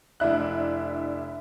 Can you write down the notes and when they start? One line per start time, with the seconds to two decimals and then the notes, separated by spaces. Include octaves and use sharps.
0.20 F1 D4 E4 F#6